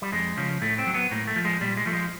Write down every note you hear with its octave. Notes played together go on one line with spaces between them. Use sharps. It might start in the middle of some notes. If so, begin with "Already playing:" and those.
G3
F2 G#3
C#3 F3
A2 A3
C4
F#3
B3
A2 A#3
A3
F3
G#3
A#2 G3
G#3
F3 A3
G#3